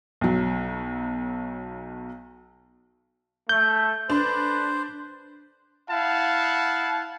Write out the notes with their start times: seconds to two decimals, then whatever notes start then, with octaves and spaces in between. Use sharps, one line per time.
0.21 B1 F#3
3.49 A3 G6
4.10 D4 A4 B4 C5
5.91 E4 F5 F#5 A5